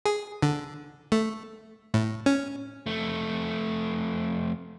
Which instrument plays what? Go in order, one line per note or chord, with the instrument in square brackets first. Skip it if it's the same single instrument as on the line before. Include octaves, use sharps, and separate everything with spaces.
[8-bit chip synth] G#4
D3
A3
A2
C#4
[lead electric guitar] F2 A3